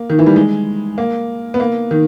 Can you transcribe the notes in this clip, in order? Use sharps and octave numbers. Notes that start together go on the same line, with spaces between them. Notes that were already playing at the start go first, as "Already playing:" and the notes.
Already playing: A#3
D#3
E3
G3
G#3
A#3
B3
A#3
D#3